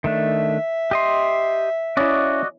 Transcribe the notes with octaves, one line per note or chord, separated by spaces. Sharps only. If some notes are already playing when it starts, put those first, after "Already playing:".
D#3 A3 D4 E5
G4 D#5 C6
C#4 E4 F#4 D5 D#5